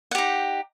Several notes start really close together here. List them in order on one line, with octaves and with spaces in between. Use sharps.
F#5 G4 D#4